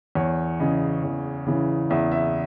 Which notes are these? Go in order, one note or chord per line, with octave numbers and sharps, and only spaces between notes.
E2 C#5
C#3 E3 D#5
E2
C#3 E3
E2 E5
E5